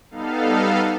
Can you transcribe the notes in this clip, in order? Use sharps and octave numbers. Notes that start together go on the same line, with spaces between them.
G3 B3 D#4 A4 F5